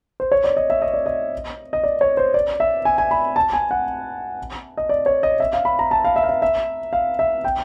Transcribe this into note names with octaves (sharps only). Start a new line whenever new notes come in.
C5
C#5
D5
D#5
E5
D#5
D5
D#5
D#5
D5
C#5
C5
D5
E5
G#5
G#5
B5
A5
G#5
F#5
D#5
D5
C#5
D#5
E5
F5
B5
A#5
A5
F5
E5
F5
E5
E5
F5
E5
G5